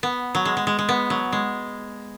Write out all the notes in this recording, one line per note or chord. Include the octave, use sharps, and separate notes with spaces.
B3
F#3
G#3
G#3
G#3
G#3
B3
F#3
G#3